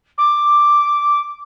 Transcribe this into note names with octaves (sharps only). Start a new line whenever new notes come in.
D6